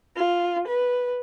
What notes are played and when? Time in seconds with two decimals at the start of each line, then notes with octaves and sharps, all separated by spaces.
0.16 F4
0.67 B4